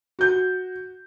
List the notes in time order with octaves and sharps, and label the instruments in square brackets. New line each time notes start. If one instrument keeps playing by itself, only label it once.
[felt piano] F#4 G6